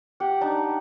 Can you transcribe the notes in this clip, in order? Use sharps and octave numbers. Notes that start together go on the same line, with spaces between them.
G4 F#5 G5
D4 D#4